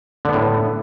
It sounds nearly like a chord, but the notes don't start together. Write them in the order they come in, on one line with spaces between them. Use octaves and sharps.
D3 B3 A2